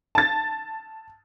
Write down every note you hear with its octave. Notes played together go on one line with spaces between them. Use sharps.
A5 A6